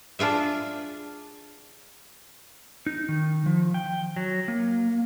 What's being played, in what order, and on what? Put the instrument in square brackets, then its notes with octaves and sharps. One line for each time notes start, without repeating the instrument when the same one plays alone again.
[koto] D4 F4 G#4 E5
[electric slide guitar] D#4
D#3
F3
G5
F#3
A#3